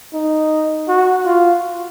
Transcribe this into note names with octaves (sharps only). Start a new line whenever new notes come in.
D#4
F#4
F4